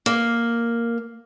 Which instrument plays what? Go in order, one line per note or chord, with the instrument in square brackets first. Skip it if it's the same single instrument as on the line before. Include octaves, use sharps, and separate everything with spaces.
[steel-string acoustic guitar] A#3